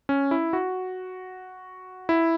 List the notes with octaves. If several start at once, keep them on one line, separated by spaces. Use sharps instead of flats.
C#4
E4
F#4
E4